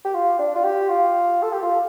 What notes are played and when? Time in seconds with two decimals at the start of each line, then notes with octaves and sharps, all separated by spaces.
0.05 G4
0.14 F4
0.39 D4
0.55 F4
0.64 G4
0.89 F4
1.42 A4
1.53 G4
1.63 F4